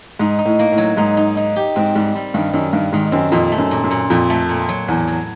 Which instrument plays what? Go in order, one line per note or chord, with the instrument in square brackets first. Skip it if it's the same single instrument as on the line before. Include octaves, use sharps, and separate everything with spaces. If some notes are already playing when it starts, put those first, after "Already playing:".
[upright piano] G#2 [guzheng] D#4
[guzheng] D#4
[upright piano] A2
[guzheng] A#3
[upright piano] A2
[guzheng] F#3
[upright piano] G#2 [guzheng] D#4
[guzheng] D#4
D#4
G4
[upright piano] G#2 [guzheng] C4
[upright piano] G#2 [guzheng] G3
[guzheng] G3
[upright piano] G2 [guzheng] D#3
[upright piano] F#2 [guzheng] D#3
[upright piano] G2 [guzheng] D#3
[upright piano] G#2 [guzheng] D#3
[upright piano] F#2 [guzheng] C4
[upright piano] F2 [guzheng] A#2
[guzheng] A3
[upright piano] F#2
[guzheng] A#2
[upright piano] F#2
[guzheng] A#2
[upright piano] F2 [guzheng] A#2
[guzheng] A3
A#2
F#3
[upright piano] E2 [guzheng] A2
[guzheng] F#3